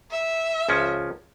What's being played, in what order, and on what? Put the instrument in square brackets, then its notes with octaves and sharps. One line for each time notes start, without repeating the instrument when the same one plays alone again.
[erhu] E5
[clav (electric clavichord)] C#2 F3 C#4